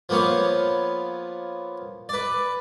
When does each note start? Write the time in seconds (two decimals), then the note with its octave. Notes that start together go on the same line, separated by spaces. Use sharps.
0.09 F3 A#3 B3 C#5 F5
2.09 B4 D5